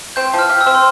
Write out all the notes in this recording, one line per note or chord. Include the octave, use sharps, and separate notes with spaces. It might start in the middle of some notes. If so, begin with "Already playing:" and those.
C4 G6
F3
F6
G4
E6
C4
C6